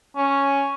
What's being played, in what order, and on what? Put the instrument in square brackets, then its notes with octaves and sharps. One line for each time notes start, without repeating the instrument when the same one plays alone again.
[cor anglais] C#4